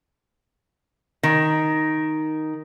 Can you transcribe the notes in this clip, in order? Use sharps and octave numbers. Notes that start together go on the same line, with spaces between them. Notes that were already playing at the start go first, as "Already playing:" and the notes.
D#3